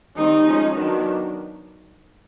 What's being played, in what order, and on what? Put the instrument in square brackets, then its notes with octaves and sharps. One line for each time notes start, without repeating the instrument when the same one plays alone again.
[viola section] D#3 G3 C4 D#4
F3 G#3 C#4
D#3 F#3 B3 D4